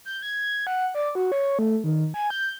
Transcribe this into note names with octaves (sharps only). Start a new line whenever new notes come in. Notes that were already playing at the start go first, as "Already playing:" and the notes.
G6
G#6
F#5
D5
F#4
C#5
A3
D#3
G#5
G6